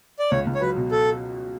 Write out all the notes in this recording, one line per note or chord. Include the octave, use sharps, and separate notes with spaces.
D5
C#2 C#5
C#2
C#5
F#3 B4
B2
A4